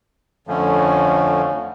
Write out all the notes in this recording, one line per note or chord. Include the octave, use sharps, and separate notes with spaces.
F2 D3 F3 A3 C#4